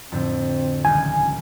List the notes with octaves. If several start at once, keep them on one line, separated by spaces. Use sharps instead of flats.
F2 A2 D3 C4
D#1 C#2 G#5 G6